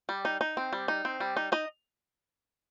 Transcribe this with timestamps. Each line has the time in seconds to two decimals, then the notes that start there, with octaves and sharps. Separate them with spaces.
0.09 G3
0.25 D#4
0.41 D#4
0.57 C4
0.73 G3
0.88 D#4
1.05 C4
1.20 G3
1.37 D#4
1.52 D#4 D#5